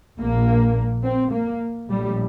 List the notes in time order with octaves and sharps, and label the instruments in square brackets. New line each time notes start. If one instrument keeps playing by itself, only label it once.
[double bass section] A#1 A#2 A#3
C4
A#3
A#1 A2 G3